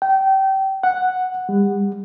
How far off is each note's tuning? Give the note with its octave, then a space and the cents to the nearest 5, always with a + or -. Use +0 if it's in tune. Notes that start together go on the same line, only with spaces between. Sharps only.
G5 -25
F#5 +0
G3 +40